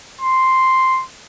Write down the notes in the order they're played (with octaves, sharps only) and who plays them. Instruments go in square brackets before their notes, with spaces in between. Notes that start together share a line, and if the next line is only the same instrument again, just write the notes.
[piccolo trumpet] C6